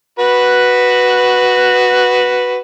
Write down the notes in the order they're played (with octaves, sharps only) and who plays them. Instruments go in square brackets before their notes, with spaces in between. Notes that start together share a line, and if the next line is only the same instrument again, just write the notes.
[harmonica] F#4 B4